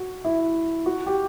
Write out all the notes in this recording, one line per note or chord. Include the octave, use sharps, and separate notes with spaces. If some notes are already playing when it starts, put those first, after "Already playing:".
Already playing: F#4
E4
F#4
G4